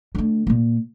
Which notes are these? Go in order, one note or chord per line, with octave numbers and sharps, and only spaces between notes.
D3 A3
A#2 A#3